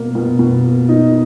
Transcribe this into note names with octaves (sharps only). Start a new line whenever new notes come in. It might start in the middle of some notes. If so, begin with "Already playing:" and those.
Already playing: B2 A#3
B2
B2
A#3
D#4